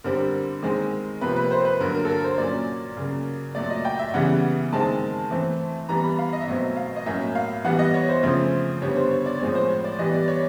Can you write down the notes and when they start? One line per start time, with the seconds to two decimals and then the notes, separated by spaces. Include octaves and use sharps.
0.04 D3 G3 C4 A#4
0.63 D#3 G#3 C4
1.21 C3 F3 A#3 B4
1.36 B4
1.51 C5
1.65 B4
1.80 D3 F#3 A#3 A#4
1.95 A#4
2.05 A4
2.09 A#4
2.24 C5
2.38 A#2 F#3 A#3 C#4 D5
2.97 C#3 F#3 A#3
3.55 A#2 F#3 A3 D5
3.70 D#5
3.85 G5
3.99 E5
4.14 C#3 E3 G3 B3 F#5
4.73 D#3 G#3 C4 A5
5.31 E3 A3 C4
5.89 E3 G3 B3 A#5
6.04 B5
6.19 F5
6.33 D#5
6.41 E5
6.47 B2 F#3 A3 C4 D#5
6.77 F5
6.96 D#5
7.06 A2 F#3 A#3 C#4 E5
7.35 F5
7.64 E3 G3 B3 F#5
7.79 D#5
7.94 C#5
8.09 C5
8.23 C#3 F3 A3 C4
8.82 D3 G3 B3 C#5
8.96 C5
9.11 C#5
9.26 D5
9.40 A2 F3 G#3 C4 C#5
9.55 C5
9.69 C#5
9.84 D5
9.99 E3 G3 B3 D#5
10.13 D5
10.28 C#5